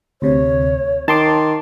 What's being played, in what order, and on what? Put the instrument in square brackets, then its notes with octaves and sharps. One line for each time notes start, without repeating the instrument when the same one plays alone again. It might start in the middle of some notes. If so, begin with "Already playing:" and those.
[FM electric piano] D2 C3 [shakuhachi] C#5
[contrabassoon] D#3 [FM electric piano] A5 C6 D6